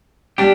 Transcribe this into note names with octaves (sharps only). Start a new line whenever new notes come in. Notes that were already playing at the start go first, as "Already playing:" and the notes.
G3 D4 G4